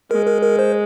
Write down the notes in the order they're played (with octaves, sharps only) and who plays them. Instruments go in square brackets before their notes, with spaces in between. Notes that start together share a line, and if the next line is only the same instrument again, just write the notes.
[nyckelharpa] G#3 [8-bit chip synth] A#4
[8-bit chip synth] A#4
A#4
C5